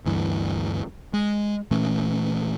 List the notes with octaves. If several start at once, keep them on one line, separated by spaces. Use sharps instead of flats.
D2 G2 E3
G#3
A#2 E3 A3 C#4